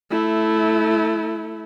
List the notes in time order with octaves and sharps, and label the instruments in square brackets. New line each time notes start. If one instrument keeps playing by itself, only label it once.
[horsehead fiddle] A3 E4